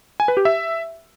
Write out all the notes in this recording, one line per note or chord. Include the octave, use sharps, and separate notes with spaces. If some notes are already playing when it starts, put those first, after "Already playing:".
G#5
B4
G4
E5